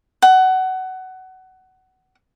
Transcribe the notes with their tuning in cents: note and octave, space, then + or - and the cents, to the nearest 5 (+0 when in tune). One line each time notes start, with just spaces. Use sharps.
F#5 +20